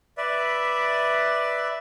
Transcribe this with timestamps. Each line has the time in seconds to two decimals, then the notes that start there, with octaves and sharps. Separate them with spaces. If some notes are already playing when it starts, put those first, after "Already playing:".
0.17 B4 D5 E5